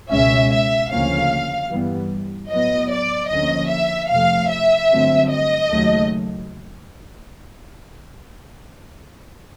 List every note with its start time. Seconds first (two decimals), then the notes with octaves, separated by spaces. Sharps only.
0.10 C#2 B2 G#3 C#4 E5
0.50 E5
0.90 D2 C#3 F3 A#3 C#4 F5
1.70 G2 E3 G3 B3
2.50 A2 F#3 B3 D#5
2.91 D5
3.30 D2 D3 F3 A#3 C#4 D#5
3.71 E5
4.10 F2 C3 F3 A3 F5
4.50 E5
4.90 G2 D3 F#3 A3 C4
5.30 D#5
5.70 D#2 C#3 F#3 A3